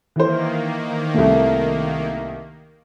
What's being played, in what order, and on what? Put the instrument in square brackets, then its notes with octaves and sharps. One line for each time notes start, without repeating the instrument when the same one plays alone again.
[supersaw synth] D#3 A#3 [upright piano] E3 C5
[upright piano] C2 A3